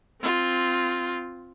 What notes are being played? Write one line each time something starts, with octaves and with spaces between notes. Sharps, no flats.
C4 F4